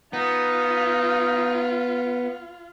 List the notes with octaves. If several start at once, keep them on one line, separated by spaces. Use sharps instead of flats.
B3 D#4 F4